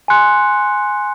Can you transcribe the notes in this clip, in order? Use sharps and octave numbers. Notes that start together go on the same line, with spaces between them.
G#5 C6 F#6 C#7